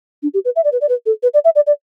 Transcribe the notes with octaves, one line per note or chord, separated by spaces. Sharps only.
D4
G4
B4
E5
D5
B4
D5
B4
A4
B4
D5
E5
D5
D5